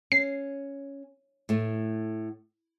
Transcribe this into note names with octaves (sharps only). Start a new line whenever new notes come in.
C#4 C7
A2 A3